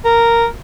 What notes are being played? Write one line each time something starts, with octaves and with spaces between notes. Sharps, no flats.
A#4